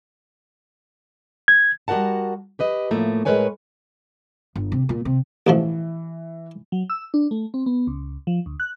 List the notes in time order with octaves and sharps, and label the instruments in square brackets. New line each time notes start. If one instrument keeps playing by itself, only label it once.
[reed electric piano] G#6
[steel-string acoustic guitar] G3 F#4 A#4 F#5 A5
G4 B4 D#5
A2 F3 A3 A#3
A2 G#3 A#4 B4 C#5 G#5
[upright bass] G1
C3
A#2
C3
[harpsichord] A1 B2 F3 [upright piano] E3
[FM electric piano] F#3
E6
D4
A3
C4
B3
C#2
F3
D2
F#6